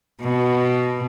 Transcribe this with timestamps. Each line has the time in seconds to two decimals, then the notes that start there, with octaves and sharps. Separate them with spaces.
0.21 B2